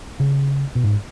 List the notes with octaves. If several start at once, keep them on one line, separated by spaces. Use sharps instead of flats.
C#3
B2
G#2